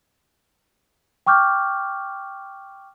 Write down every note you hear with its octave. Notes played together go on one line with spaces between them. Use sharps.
G5 C#6 D6 F6 G6